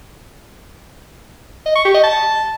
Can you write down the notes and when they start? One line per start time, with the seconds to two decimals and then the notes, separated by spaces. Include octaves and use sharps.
1.66 D#5
1.75 C#6
1.85 G4
1.94 D#5
2.04 A5